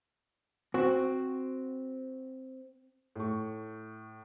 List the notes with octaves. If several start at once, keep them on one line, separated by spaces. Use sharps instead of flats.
C4 F#4
A2 C#6